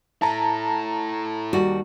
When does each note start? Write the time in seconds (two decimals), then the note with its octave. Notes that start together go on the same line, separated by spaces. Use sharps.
0.22 E4 A4 A5 A#5
1.53 D#2 G3 F#4